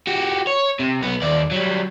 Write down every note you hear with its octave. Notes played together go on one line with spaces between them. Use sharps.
F#4 G4
C#5
C3
B1 B3
D#2 D5
F#3 G3